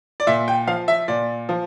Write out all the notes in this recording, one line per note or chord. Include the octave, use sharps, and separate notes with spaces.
D5
A#2 E5
G5
F3 F5
E5
A#2 D5
F3